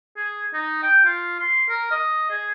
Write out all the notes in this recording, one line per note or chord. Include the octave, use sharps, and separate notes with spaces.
G#4
D#4
G5
F4
C6
A#4
D#5
G#4